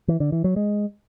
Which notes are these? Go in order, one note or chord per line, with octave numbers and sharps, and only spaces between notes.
E3
D3
E3
F#3
G#3